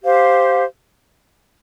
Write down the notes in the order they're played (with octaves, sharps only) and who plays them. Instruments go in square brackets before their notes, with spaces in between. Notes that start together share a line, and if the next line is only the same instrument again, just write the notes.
[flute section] G4 C5 F5